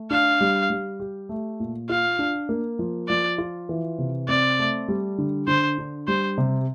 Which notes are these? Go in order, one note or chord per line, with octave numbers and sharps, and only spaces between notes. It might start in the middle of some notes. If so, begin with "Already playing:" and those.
Already playing: A3
D4 F5
G3
G3
G4
A3
A#2
F4 F5
D4
A#3
F3
F3 D5
F4
E3
C3
C4 D5
A3
G3
D3
D3 C5
D4
G3 C5
C3